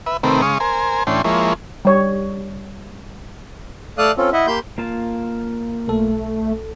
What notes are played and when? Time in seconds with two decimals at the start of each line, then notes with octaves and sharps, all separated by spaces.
0.06 B4 E5
0.23 C3 D#3 A3 C4 A#4 B4
0.42 C#3 G#3 F5 C#6 D#6
0.60 A#4 C5 G#5
1.07 A2 E3 C#4 D4 G5 C6
1.24 F3 G#3 A#3 E4 C#5
1.85 G3 C#5
3.98 A3 A4 D5 F5 D#6 F#6
4.17 C4 C#4 F4 A4
4.33 E4 D#5 E5 F#5
4.47 A#3 G4 B5 C6 G6
4.78 A#3 F4 A5
5.88 B1 A3 A4